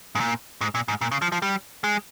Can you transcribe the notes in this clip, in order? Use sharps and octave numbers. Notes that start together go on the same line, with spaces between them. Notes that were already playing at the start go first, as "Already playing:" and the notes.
G#2
A#2
G#2
A#2
G#2
A#2
C#3
F3
F3
G3
G#3